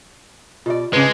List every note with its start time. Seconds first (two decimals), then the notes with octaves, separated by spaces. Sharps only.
0.66 B2 F4 G4 D5 D#5
0.93 G#2 C#3 G#3 C#4 B4 A5 D6